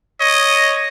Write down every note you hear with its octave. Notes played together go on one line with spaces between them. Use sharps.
C#5 D#5